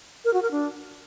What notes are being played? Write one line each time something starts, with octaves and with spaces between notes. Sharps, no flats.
A#4
F#4
A#4
D4